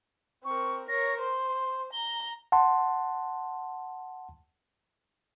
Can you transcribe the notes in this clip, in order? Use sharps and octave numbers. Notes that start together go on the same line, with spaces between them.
C4 A#4 C#6
A#4 C#5 A#6
C5 C6
A#5 G7
F#5 A5 C6